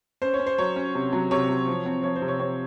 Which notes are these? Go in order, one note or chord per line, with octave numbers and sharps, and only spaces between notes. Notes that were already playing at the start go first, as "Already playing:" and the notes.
C#4 C5
C#5
C#4
C5
F#3 C#5
C#4
C3
F#3
C3 C#5
F#3
F3
C4
F3 C#5
C5
C3
C#5
C4 C#5